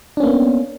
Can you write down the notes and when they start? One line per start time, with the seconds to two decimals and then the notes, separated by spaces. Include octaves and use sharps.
0.17 D4
0.20 C#4
0.23 A#3
0.26 B3